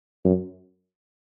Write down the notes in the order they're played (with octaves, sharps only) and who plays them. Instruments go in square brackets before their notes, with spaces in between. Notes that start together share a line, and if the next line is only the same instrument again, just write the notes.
[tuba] F#2